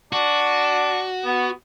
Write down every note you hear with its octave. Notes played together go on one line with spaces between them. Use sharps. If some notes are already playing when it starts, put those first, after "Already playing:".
D4 F#4
B3